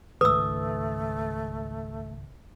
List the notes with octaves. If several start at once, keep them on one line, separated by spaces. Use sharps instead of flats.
C#2 G#2 D#3 A3 B4 D#6 E6